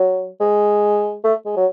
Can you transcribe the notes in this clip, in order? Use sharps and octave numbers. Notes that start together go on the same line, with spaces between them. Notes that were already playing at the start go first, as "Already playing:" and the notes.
Already playing: F#3
G#3
A3
G#3
F#3